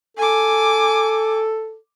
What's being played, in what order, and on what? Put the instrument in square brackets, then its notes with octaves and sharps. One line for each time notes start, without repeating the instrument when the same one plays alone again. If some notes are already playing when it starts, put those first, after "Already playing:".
[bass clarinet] A4 [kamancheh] G#5 D6